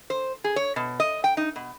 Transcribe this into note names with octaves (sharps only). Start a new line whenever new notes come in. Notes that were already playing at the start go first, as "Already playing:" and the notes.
C5
G#4
C#5
B2
D#5
G5
D#4
B2